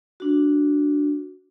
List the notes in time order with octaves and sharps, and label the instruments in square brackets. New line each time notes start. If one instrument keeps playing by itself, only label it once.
[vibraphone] D4 F#4